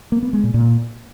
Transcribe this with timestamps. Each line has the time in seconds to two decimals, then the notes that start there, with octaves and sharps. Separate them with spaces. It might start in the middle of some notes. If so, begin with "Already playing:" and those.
0.12 A#3
0.23 B3
0.33 G#3
0.44 A#2
0.54 A#2